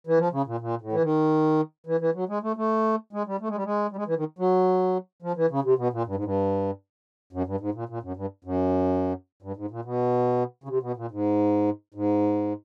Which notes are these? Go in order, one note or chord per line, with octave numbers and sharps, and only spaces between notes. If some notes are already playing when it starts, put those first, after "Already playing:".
E3
F3
C#3
A#2
A#2
A2
E3
D#3
E3
E3
F#3
G#3
A3
A3
G#3
G3
A3
G#3
G3
G#3
G3
G#3
E3
D#3
F#3
F3
E3
C#3
C3
B2
A#2
G2
G#2
G2
F#2
G2
G#2
A#2
A#2
F#2
G2
F#2
G2
G#2
A#2
B2
C#3
C3
B2
A#2
G#2
G#2